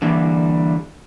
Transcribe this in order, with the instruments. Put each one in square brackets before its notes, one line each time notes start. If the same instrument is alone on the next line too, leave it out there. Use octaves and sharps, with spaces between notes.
[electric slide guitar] D3 E3 G3 A#3